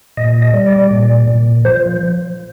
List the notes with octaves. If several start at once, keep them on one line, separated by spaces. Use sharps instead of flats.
A#2 D#5
D#5
G3
D5
A#2
A#2
F3 C5